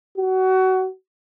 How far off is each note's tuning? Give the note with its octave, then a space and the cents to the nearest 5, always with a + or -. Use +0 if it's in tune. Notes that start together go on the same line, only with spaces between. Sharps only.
F#4 +25